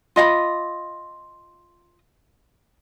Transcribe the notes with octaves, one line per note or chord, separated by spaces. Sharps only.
F4 D#5 F#5 B5